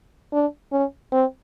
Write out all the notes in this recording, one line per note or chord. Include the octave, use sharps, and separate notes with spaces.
D4
C#4
C4